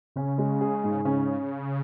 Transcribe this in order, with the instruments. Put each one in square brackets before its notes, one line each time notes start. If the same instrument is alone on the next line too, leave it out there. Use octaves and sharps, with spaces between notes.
[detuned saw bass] C#3 [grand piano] C#4
[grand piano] G#3
G#4
G#2
[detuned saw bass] C#3 [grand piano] C#4